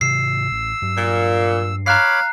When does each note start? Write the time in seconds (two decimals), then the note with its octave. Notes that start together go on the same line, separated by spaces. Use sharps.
0.01 G#2 C3 E6 C7
0.52 A1
0.82 G2 F#3
0.97 A#2
1.86 C#5 F5 A#5 B5 D6 F#6 C7